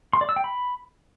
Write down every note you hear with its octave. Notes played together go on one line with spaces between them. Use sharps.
C6
D5
E6
G5
B5